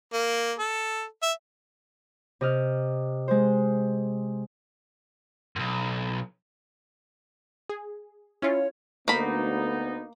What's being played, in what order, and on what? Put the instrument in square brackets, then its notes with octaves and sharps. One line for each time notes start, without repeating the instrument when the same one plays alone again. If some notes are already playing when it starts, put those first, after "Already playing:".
[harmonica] A#3
A4
E5
[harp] C3 D#5 F6
G#3 C5
[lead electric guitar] B1 F#2
[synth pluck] G#4
[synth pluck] C#4 E4 F4 [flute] C#5
[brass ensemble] D2 B3 D#4 [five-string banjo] A#3 B5